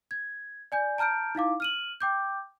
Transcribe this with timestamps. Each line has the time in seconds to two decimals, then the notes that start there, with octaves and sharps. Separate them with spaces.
0.11 G#6
0.72 D5 G#5 G6
0.98 A5 A#5 F6 G6 D7
1.35 D#4 E4 F5 D6
1.60 F6 D#7 F#7
2.01 G5 D6 G6